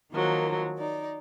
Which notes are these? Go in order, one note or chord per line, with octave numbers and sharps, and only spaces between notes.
D#3 F3 F#3 A#3
D#4 D5